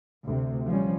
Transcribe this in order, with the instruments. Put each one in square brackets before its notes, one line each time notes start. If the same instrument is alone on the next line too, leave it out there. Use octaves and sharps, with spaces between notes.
[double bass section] D2 C3
F3 G3 C#4